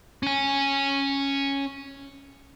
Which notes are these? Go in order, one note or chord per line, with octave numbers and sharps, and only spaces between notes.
C#4 G#5